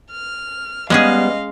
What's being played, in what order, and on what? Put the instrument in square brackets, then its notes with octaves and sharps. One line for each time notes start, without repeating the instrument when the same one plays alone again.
[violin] F6
[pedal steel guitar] G3 B3 [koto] G#3 C#4 G#4 [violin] D#5 F5